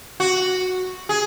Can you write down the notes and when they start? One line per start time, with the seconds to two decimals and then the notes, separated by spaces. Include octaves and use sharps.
0.20 F#4
1.09 G#4